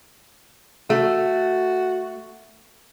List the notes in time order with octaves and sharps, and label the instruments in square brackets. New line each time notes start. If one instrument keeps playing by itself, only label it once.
[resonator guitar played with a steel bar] A3 [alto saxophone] F#4